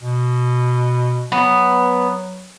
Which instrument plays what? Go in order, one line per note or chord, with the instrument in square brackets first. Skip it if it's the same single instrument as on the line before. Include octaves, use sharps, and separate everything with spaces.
[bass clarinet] B2
[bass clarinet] F#3 [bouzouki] B3